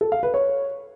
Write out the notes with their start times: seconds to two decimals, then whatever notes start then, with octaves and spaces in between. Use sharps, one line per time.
0.01 A4
0.12 F5
0.23 B4
0.34 C#5